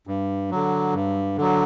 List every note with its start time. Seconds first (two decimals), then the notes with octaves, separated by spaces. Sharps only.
0.07 G2
0.51 D3 F#3
0.94 G2
1.38 D3 F#3